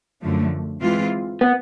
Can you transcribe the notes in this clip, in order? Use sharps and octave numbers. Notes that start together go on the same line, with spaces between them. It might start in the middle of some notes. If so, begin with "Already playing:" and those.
F#2 D3 F3 A3
E3 G#3 C4 F4
B3